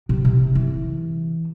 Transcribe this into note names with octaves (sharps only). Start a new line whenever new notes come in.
C3
C3
E3